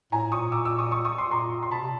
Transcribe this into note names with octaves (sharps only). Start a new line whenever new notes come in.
A2 G#5 A#5
A#2 C#6 D#6
D6 E6
D6 E6
C#6 D#6
C#6 D#6
C#6 D#6
C6 D6
A#2 A#5 C6
C6
B2 A5 B5
C3